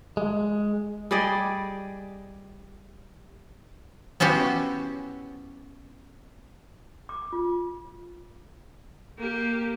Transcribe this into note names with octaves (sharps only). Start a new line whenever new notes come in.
G#3
G3 G#4 D5 D#5
B3 C#4 E4 F#4 G4
D6
F4
A#3 G4